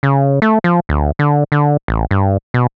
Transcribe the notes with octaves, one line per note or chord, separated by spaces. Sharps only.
C#3
A3
F3
D2
D3
D3
A1
G2
B2